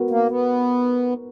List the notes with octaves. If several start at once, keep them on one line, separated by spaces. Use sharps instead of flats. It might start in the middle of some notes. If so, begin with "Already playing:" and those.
Already playing: B3 F#4 A#4
A#3
B3